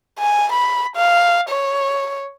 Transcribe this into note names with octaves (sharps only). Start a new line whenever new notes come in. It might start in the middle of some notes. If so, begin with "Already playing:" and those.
G#5
B5
F5
C#5